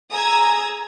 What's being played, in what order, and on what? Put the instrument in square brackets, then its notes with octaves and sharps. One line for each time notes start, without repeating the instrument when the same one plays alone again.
[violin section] G#4 A#5 D#6 E6 G#6